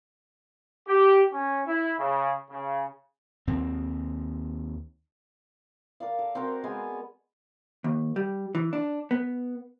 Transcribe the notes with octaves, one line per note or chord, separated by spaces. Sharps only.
G4
C#4
E4
C#3
C#3
D#2 C4
A#4 D5 F5
A4
C4 F#4 A#4 C5
G#3 B3 G#5
D#2
G3
E3
D4
B3